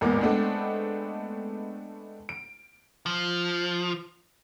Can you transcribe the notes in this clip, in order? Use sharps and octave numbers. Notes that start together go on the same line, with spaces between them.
A1 E2 G#2 A#3 B3 D6
G#3 A3 B3 C4 D4
D7
F3